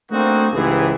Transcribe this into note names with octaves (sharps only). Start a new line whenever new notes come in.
A3 A#3 C4 D4 D#4 F#4
C#2 G#2 E3 G4 G#4